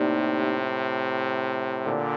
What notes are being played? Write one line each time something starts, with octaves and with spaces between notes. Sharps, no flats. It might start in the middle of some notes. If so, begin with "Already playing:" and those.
Already playing: A2 C3 A#3 D#4 G4 D5
A#2 D3